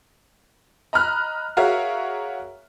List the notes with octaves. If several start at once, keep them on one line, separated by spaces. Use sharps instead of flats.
D#5 A#5 B5 F6 F#6
F#4 G#4 A#4 C#5 E5 F5